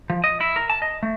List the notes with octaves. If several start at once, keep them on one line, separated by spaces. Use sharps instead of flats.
F3
D#5
E4
A#4
A5
D#5
A3